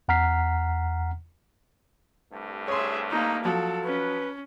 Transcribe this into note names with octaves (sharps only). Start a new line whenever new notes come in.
E2 F#5 A#5 F6 B6 C7
C2 G2 A3
G#4 C#5 E5 C6
A#3 D#4
F3 F#3 A4
C#4 B4